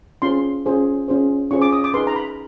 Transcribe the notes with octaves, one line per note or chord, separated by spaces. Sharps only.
C#4 F4 G#4 C5 C6
C#4 F4 G#4 C5
C#4 F4 G#4 C5
C#4 F4 G#4 C5 C#6
D6
D#6
D6
D#4 G#4 B4 C6
A#5
B5